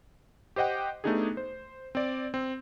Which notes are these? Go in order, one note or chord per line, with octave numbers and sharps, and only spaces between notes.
G4 C5 D#5 F#5 G5
A3 B3 D4 D#4 G4 G#4
C5
C4 D5
C4